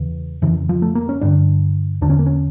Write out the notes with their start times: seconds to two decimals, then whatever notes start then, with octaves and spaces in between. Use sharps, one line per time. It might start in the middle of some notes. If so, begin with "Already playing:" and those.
Already playing: E2 C#3 E3
0.42 F2 C#3 E3
0.69 F3
0.82 A3
0.95 A#3
1.09 C#4
1.21 G2 D3 D4
2.01 E2 D3 D4
2.10 C#4
2.19 A#3
2.26 C#4